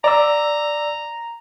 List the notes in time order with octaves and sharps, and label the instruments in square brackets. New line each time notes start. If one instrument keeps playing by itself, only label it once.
[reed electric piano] D5 E6 [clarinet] A#5